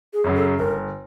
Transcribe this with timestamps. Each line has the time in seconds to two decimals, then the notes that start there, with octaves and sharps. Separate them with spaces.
0.13 G#4
0.24 F#2 C#3 F#3
0.36 A4
0.59 G1 A#4